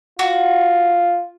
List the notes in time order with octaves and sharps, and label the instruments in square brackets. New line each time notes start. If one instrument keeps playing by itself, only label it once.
[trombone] F4 [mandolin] F#4